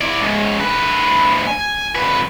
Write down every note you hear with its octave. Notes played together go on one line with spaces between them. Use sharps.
E4 D5
G#2 C#3
D2 B4
G#5
F2 B4